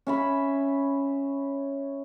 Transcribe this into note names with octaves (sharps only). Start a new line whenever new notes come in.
C#4 E5 B5